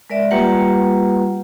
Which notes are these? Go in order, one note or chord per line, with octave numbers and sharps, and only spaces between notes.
G#3 A#4 D5 E5
G3 A#3 F4 G4 B4 F#5